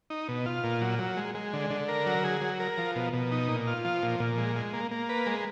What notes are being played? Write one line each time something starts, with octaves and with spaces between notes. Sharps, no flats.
D#4
B2
F4
A#2
F#3
F#3
G#3
G#3
D3
D3
A#4
F#3
G#4
F#3
A#4
F3
B2
B2
D#4
A#2
F4
F3
A#2
A#2
G#3
G#3
A#3
A#3
B4
G#3